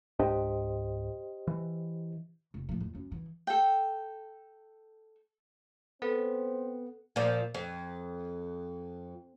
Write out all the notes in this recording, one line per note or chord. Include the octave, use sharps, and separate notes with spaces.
C#2 G#2 D4 G4 C5 D#5
E3
F1
A2 F3
F2
F#2
E3
A4 G5
B3 C4 A4 C5
A#2 F3
F2